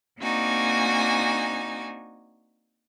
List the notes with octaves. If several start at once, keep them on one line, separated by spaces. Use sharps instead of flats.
A#3 C4 D4 D#4 F#4 G#5